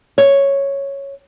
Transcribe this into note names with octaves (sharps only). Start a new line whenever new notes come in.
C#5